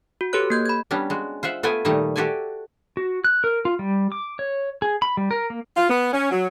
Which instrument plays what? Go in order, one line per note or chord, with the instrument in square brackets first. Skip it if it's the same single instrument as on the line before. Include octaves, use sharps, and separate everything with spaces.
[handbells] F#4
G4 A4 B4 C#5 F#6
A#3 G6 G#6
B5 G#6
[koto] G3 B3 C#4 D4
G#3 F#4
F4 C5 E5 F#5
A3 B3 F4 A4 G5 G#5
A#2 D#3 G3 A3 D#4
F#4 G4 A4 D5 E5 G#5
[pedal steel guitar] F#4
F#6
A#4
F4
G3
D6
C#5
G#4
B5
G3
A#4
A#3
[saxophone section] F4
B3
C#4
F#3